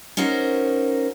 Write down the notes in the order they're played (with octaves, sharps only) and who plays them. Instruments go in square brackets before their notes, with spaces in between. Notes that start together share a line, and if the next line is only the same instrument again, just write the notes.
[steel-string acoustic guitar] C#4 D#4 F#4 A#4 C5